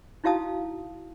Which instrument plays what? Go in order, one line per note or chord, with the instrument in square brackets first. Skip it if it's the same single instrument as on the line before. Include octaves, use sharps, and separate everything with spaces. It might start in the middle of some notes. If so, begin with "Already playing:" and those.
[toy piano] D#4 E4 F#4 F5 A5 D#6